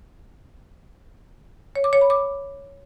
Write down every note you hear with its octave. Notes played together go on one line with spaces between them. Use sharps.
C#5
D6
C#5
B5
D6